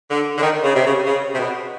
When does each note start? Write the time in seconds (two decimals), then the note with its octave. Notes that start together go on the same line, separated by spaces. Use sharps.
0.11 D3
0.38 D3
0.43 D#3
0.64 C#3
0.76 C3
0.85 C#3
1.06 C#3
1.33 C3
1.39 B2